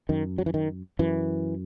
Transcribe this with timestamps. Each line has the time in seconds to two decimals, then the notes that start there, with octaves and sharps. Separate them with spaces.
0.09 F#2 D#3
0.38 F#3
0.46 E3
0.54 D#3
0.99 F#2 E3